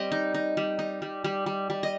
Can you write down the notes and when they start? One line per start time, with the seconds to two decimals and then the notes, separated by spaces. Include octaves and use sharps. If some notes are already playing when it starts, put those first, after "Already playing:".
Already playing: G3 C4 D#5 G5
0.12 D#4
0.34 D#4
0.57 G3
0.79 D#4
1.02 G3
1.24 G3
1.46 G3
1.70 G3
1.83 D#5